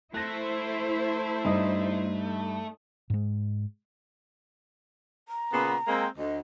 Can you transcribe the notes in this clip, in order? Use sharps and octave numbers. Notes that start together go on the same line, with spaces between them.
A3 E4 C5 F#6 A#6
G2 D#4 D#6
G#2 G#3
A#5
A#2 C#3 B3
G#3 A#3 C4
D2 D#5